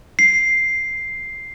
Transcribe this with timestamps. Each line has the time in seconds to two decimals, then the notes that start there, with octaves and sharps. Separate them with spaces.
0.19 C7